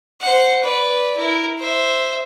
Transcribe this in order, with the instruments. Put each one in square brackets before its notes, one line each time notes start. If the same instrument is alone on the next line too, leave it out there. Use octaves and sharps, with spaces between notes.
[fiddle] C5 F#5
B4 D5
E4 A#4
C5 E5